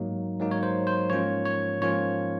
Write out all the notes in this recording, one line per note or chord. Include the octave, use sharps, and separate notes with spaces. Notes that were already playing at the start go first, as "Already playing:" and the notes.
Already playing: G#2 F#3 A#3 D#4
G#2 F#3 A#3 D#4
C#5
C5
C5
G#2 F3 A#3 C#4 F4 C#5
C#5
G#2 F3 A#3 C#4 F4 C#5